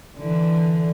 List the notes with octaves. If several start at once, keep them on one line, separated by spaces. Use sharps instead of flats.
D3 E3